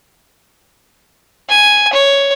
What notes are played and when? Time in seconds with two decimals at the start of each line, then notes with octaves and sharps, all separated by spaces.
1.49 G#5
1.93 C#5